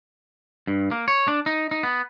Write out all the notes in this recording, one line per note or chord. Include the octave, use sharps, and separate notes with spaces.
G2
A#3
C#5
D4
D#4
D#4
B3